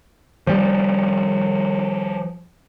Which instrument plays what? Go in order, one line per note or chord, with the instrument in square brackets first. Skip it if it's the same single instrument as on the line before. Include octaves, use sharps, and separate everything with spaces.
[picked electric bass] F3 G3